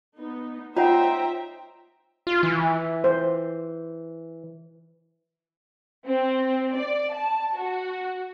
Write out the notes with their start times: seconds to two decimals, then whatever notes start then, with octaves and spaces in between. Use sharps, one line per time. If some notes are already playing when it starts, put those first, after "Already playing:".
0.18 B3 D#4
0.76 D#4 F4 C5 C#5 E5 F#5 G5 A#5
2.27 F4
2.43 E3
3.04 C5
6.05 C4
6.76 D5
7.11 A5
7.56 F#4